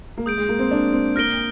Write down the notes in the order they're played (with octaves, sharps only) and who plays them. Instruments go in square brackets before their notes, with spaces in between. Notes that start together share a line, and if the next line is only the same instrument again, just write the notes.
[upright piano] A#3
[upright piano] G#3 [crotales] D#6 G6 D7
[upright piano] G#3
A#3
C4
D4
C4
[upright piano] A#3 [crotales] F6 A#6 D7 G7